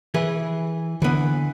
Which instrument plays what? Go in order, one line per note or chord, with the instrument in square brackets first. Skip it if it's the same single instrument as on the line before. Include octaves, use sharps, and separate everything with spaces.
[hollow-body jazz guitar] E3 G#4 B4
[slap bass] D3 [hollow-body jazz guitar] E3 B3